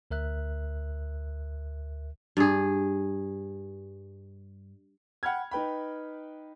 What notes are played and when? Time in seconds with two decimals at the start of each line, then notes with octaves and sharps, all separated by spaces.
0.11 D2 A#4 E5 F#6
2.37 G2 G#4
5.23 F#5 G5 B5 F6 G#6
5.51 D#4 B4 G5 B5